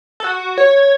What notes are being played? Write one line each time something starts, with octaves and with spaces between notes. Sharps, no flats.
A4
F#4
C#5